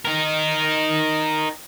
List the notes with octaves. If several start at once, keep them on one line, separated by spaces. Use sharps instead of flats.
D#4 A#4